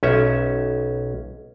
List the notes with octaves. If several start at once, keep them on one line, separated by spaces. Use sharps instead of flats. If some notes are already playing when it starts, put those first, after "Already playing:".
B1 C#4 E5